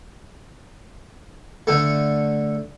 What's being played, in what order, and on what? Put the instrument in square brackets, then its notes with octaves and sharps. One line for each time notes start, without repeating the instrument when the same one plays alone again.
[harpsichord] D3 A3